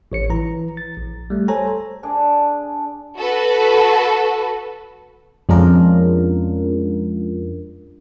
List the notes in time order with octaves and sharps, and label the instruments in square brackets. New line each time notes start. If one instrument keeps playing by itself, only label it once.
[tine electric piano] A1 C#5 C#7
E3 A#5
A6
A#1
G3 A3
A4 C5 C#5 G#5 A#5
[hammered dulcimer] D4 G#4 D5
[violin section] F#4 A4 B4
[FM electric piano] F2 G#3 C#4 D4 F4 A#4